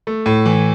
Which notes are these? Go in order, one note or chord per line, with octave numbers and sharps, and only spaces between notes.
A3
A2
E3